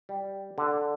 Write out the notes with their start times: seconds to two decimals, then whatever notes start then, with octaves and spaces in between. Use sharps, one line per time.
0.09 G3
0.58 D3